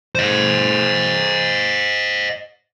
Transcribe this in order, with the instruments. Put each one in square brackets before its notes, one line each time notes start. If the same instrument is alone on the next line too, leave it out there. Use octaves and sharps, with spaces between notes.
[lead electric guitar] C5 D#5